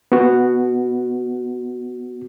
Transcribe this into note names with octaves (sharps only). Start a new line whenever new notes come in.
B3 F#4